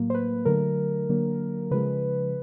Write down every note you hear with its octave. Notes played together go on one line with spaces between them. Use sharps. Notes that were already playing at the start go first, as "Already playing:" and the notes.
Already playing: A2 F#3 A#3
C5
B4
D3 F#3 A3 A#4
D3 F#3 A#3
C#3 F3 G#3 B4